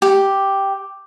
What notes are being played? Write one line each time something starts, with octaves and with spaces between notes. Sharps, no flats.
G4